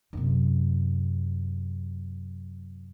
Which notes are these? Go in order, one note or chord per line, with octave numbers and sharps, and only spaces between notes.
F#2 C3